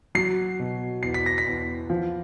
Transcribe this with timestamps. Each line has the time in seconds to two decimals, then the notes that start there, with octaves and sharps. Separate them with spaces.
0.15 F#3 C7
0.60 B2
1.03 E2 C7
1.14 B6
1.26 A#6
1.38 B6
1.46 E2
1.90 F3